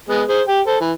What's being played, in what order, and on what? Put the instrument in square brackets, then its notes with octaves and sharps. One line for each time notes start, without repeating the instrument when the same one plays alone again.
[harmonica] G#3 B3
G#4 C5
G4 G5
A4 C5
E3